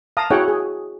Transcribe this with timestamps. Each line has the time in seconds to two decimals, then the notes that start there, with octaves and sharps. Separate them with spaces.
0.17 F5 A5 A#5 D#6
0.30 E4 F#4 G#4 C#5 F#5 G5
0.48 G#4